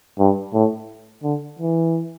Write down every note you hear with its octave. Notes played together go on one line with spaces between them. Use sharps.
G2
A2
D3
E3